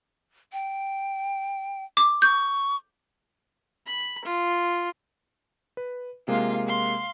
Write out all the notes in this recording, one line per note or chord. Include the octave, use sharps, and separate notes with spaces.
G5
D6
C#6 G6
B5
F4
B4
C3 G#3 A#3 F4 F5
F5 C6